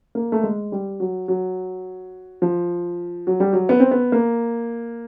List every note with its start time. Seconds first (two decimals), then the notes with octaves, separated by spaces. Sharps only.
0.15 A#3
0.32 A3
0.43 G#3
0.72 G3
1.00 F#3
1.28 F#3
2.42 F3
3.27 F#3
3.40 G3
3.53 F#3
3.69 B3
3.80 C4
3.91 B3
4.12 A#3